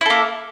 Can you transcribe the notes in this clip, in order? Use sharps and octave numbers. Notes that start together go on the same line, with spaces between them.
A#3 E4 A4